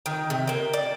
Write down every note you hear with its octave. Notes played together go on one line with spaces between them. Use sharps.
D#3
C3
A#3 G5
D5